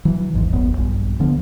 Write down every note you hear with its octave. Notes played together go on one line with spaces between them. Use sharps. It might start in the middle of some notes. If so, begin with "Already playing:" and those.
E3 F#3
G#1 D#2 G#2
D#1 G#1 F#2 B3
A#1 G2
D2 D3 F3 B3